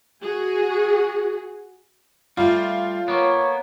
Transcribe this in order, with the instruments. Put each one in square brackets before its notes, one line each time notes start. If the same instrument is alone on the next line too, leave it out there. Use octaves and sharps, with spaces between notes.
[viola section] F#4 G#4
[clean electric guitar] G3 A3 [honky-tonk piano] F4
[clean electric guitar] A#3 B3 [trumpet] C#5